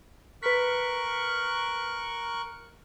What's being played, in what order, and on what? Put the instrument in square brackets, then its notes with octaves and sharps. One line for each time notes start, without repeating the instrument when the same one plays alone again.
[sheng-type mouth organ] A#4 C#6 F#6 [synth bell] B4 B6